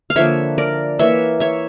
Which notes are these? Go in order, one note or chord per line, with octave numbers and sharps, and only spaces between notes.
F5
D3 F3 A#3 C#5 E5
A#4 D5
E3 A#3 C#5 E5
C#5 E5